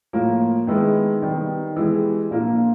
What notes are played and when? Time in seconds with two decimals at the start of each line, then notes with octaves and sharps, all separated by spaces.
0.13 A2 F3 A#3
0.67 D#3 G#3 B3 E4
1.22 D#3 G3 B3
1.76 E3 G#3 B3 E4 G4
2.30 A#2 F3 A#3 D4 F4